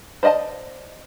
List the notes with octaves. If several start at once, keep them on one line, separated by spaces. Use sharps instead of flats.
C5 D5 D#5 F#5 A5